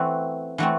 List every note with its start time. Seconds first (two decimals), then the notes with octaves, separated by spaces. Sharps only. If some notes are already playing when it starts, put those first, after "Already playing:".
Already playing: E3 A3 C4 F#4
0.58 E3 A3 C4 F#4